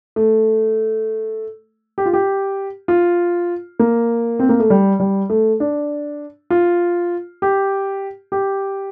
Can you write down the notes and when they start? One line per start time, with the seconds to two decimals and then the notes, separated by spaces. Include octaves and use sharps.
0.16 A3
1.98 G4
2.06 F4
2.13 G4
2.88 F4
3.80 A#3
4.39 C4
4.49 A#3
4.60 A3
4.70 G3
5.00 G3
5.30 A3
5.60 D4
6.50 F4
7.42 G4
8.32 G4